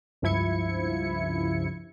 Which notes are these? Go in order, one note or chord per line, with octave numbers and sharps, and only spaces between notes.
C#2 G2 F3 E4 G#6 C#7